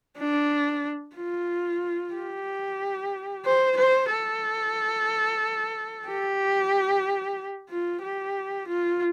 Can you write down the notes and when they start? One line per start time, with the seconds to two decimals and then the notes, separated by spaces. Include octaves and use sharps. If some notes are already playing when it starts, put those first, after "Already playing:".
0.19 D4
1.16 F4
2.14 G4
3.45 C5
3.78 C5
4.11 A4
6.07 G4
7.70 F4
8.03 G4
8.68 F4